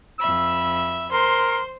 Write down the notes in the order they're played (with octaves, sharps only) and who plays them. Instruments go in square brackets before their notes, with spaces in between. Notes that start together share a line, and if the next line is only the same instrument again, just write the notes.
[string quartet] F2 E5 B5 [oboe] E6
[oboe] A#4 [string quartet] C5 [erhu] C6